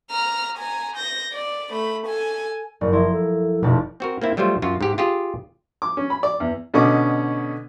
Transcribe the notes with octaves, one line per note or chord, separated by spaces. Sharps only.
A#5 F6
G#5 A#5
G6 A#6
D5
A3 B5
A4 G#5
F#1 D5
F3 E4 A#5 C6
A4
F1 F2 B2 A5
C4 F#4 A#4
A#3 C4 E4
F#3 G3 A3 F4 C5
F#2 F4 F#4
G#2 G4
F4 G4 G#4
D6
C#4
B5
D5
E2
B2 D3 C#4 D#5 D6